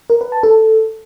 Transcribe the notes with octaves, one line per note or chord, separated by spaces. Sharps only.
A#4
B4
A5
A4